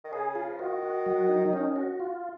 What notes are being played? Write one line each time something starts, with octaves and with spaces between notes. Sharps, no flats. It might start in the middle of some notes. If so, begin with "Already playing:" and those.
D#3
C#3 G#4
F4
F3
D#3 F#4
F#4
F#3
D#4
C#4
F#4
F4